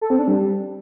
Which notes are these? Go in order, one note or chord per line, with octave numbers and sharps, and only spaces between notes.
A4
C4
D4
G3